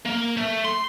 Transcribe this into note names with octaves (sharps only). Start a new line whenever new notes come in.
A#3
A3
C6